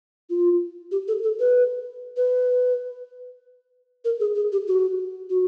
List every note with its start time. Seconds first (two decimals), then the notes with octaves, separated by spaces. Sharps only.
0.30 F4
0.92 G4
1.08 A4
1.23 A4
1.40 B4
2.17 B4
4.05 A#4
4.20 G#4
4.35 G#4
4.52 G4
4.67 F#4
5.30 F#4